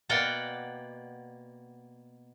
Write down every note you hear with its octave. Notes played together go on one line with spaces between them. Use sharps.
B2 A#3 D5 F#5 G5